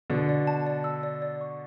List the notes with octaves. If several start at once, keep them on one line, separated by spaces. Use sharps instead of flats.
B2 D3 D5
D5
A5
D5
E6
D5
D5
C#6